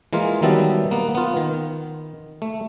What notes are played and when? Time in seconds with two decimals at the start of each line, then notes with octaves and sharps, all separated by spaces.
0.13 E3 G#3 A#3 F4
0.42 D#3 F#3 G3 B3 E5 A5
0.91 A#3 B3
1.15 B3 F4
1.37 D#3
2.42 A3